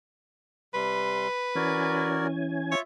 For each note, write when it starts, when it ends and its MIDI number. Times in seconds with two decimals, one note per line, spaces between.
0.74 1.28 48
0.74 1.28 55
0.74 2.23 71
0.74 1.28 84
1.55 2.75 52
1.55 2.75 61
1.55 2.27 66
1.55 2.27 70
1.55 2.27 74
1.55 2.75 80
2.71 2.82 65
2.71 2.79 73
2.71 2.82 76